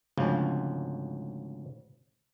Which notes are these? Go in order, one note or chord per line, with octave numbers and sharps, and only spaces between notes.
G#1 D2 C#3 F3